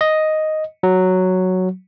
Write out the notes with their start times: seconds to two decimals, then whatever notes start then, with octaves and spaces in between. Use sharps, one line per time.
0.01 D#5
0.83 F#3